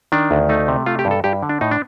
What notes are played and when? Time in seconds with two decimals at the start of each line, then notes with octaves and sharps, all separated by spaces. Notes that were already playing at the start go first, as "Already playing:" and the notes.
0.12 D#3 D4
0.31 D2
0.49 A3 D#4
0.68 C3
0.86 A3 F4
0.99 G4
1.05 G2
1.11 A4
1.24 G2 G4
1.43 D3
1.49 D4
1.61 A2 D#4
1.71 D4